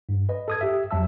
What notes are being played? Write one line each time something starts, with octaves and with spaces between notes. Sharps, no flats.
G2
B4 D#5
A4 D#6 G#6
G4 E5
F2 F#3 E5 A5 E6